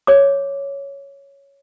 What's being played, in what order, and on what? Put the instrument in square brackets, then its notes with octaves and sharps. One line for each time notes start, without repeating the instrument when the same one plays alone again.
[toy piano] C#5 D6